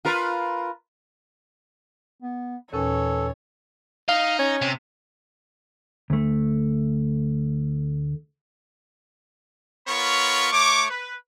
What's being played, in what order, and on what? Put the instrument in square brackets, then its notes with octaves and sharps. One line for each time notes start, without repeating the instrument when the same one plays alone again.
[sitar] F4 A#4 B4
[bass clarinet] B3
[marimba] D#2 A#2 C#4 [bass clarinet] E3 [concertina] A4 [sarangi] C#5
[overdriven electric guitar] D#4 [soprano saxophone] F5
[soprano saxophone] C#4
[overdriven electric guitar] C3
[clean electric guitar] D2 A3
[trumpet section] B3 F4 A#4 C#5 B5 C#6
A3 C#5 C#6 D6
B4